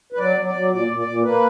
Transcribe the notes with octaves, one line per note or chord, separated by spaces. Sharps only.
B4
F#3 D5
F#3
D5
F#3
A#2 D5
A#2
D5
A#2
A#3 B4